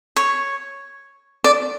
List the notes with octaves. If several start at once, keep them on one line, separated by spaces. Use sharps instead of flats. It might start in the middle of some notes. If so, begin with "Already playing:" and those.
C#5
D5